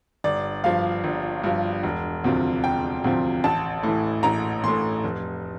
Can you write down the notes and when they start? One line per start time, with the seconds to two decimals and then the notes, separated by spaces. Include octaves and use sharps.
0.24 G1 D5
0.64 G2 F3 F5
1.04 G1
1.44 G2 F3
1.83 E1
2.24 D2 C3 F3
2.64 E1 G5
3.04 D2 C3 F3
3.44 A1 A5
3.83 A2 E3
4.23 A1 A#5
4.64 A2 E3 C6
5.04 F1